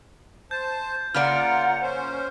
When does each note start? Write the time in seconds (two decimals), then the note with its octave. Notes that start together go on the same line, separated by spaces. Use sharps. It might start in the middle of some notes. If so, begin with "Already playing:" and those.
0.51 C5 A5 G6
1.14 C#3 A#3 F4 D5 F#5 A#5 F6
1.82 C#4 C5